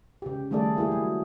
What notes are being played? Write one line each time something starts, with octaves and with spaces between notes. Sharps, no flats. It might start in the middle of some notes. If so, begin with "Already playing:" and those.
C#3 G4
D#3 G3 A3 G#4 A4 D5
A#3 E4 G4 G#4
F#3